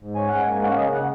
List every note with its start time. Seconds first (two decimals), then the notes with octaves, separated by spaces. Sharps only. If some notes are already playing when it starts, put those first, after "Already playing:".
0.01 G#2
0.15 C#4 G#5
0.28 G#2 F#5
0.42 G#5
0.47 A#3
0.62 C#4 F#5
0.77 C#3 D#5
0.93 F#5